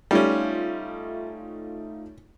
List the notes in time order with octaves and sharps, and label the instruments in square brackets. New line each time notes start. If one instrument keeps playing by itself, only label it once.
[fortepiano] G3 C#4 [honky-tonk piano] A3 D#4 F4